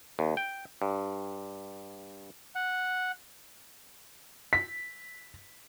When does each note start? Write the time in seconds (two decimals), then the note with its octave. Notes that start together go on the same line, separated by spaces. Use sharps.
0.19 D#2
0.37 G5
0.82 G2
2.55 F#5
4.53 B6